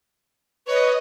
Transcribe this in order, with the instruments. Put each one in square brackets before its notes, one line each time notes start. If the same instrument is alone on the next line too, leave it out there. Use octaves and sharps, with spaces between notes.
[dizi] B4 [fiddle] C#5 [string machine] D#5